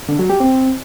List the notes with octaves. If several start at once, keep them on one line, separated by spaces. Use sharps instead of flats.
D3
F#3
G4
C4